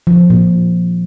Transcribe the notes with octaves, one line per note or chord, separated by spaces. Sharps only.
F3
A#2